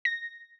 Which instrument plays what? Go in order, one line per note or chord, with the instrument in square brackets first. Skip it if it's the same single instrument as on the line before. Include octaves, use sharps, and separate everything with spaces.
[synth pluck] A#6